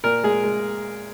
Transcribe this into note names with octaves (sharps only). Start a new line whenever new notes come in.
A#2 A#4
G#3 G#4
G#3